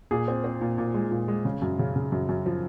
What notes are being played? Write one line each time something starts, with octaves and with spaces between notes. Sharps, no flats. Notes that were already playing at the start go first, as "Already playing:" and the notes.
A#2 G#4
C4
C4
A#2
A#2
G#3
A#2
G#3
C#3
F#2
C#3
C#3
F#2
F#2
F3